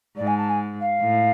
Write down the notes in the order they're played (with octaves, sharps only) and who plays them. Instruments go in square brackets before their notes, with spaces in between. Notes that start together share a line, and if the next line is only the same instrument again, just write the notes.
[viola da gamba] G#2 [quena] D5
[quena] G#5
A5
G#5
F5
[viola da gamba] A2